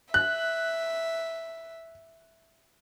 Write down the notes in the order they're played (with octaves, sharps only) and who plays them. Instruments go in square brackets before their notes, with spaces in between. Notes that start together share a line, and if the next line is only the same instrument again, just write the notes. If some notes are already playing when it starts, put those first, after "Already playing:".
[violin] E5 [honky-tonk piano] F#6